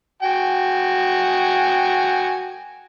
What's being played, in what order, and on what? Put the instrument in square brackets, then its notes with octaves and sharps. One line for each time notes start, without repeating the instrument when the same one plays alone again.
[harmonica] F#4 G5 G#5